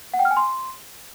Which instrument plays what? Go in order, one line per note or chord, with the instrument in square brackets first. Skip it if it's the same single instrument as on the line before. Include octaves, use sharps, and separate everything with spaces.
[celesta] F#5
G5
F6
G#5
C6